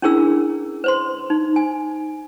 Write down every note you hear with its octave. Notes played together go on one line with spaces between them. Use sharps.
C#4 D4 E4 G#4 A#4 E6
B4 C5 C6
D#4
G#5